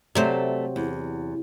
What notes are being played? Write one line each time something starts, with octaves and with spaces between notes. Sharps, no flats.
C3 F#3 A3 C5 D5
E2